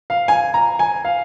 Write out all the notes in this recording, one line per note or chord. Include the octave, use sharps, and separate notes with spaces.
F5
G#5
A#5
G#5
F5